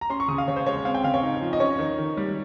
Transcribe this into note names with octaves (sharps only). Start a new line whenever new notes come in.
A#5
C#4 C6
C#6
C#3 D#6
F5
C#3 C#5
C5
G#3 C#5
C4 F5
G5
C#3 F5
C#5
D#4
F3
D#5
C#4 C#5
D#3
D#3
G3